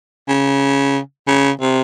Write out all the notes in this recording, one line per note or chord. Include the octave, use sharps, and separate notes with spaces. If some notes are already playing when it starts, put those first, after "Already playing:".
C#3
C#3
C3